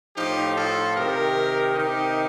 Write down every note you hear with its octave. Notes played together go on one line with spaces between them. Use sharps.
A2 F3 D#4 G4
F4 A4
C3 D#3 G4 A#4
C3 D#3 D#4 G4